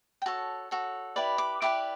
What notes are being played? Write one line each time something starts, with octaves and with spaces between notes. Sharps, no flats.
G5
F#4 A4 C#5 A5
F#4 A4 C#5
E4 G4 B4 D5
D6
E4 G4 B4 D5 D6